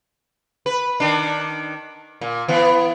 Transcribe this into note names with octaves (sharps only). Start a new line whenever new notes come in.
B4
D#3 D4
A#2
E3 B3